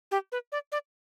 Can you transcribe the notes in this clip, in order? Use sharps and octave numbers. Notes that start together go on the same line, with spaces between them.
G4
B4
D5
D5